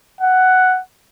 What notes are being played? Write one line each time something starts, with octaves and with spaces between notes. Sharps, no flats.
F#5